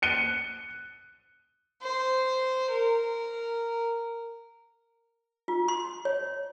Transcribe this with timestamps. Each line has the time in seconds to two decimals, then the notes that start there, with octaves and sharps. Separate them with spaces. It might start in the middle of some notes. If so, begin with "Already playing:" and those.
0.02 F#6 C#7 D#7 G7
1.82 C5
2.71 A#4
5.48 F4
5.68 C6
6.05 C#5